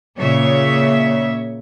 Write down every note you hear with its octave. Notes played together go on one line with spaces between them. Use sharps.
A#2 C#3 C#5 E5